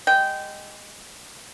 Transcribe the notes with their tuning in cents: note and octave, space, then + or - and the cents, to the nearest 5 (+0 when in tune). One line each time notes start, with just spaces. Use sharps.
G#3 -15 G5 -15